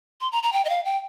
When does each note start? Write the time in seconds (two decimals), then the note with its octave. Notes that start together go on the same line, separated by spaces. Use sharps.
0.21 C6
0.32 A#5
0.43 A#5
0.53 G5
0.65 D#5
0.69 F5
0.85 G5